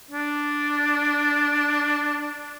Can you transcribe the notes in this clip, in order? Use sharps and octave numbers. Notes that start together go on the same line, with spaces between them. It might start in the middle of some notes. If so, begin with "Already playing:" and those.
D4